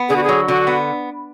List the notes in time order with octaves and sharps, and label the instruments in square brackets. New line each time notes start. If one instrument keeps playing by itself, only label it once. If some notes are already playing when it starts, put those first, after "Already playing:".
Already playing: [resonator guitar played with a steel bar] B3
[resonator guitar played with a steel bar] D3 [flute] G#4
[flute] F#4
G#4
[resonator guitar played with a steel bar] F#3
[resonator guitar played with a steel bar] D3 [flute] F#4
[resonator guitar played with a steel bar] B3